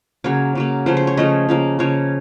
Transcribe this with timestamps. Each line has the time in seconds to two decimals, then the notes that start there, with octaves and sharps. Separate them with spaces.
0.24 C#3 F#3 A#3 C#5
0.55 C#3 F#3 A#3
0.86 C#3 F3 A3 C5
0.97 C5
1.07 C#5
1.17 C#3 F3 A3 D#5
1.49 C#3 F3 A#3
1.79 C#3 F3 A#3 C#5